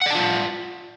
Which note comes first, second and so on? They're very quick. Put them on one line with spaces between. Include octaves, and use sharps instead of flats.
F#5 D5 A5 F4